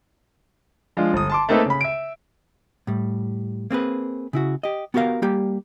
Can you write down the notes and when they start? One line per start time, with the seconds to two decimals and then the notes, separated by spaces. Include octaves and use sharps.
0.97 F3 G#3 D4 F4
1.13 G1 D#6
1.30 A5 C6 D6
1.49 A3 A#3 C4 D#4 A4 B4
1.66 C#3 B5
1.81 E5 D7
2.87 A2 G3
3.71 A#3 C4 G#4 B4
4.33 C#3 E4 F#4
4.63 G4 D#5
4.94 B3 F#4 G4 A#4 F5
5.22 G3 A#3 G4